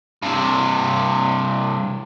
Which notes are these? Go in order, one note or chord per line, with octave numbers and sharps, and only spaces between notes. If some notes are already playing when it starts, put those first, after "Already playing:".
G2 C3